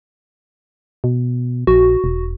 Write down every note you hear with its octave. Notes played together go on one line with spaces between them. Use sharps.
B2
A#1 F#4
E1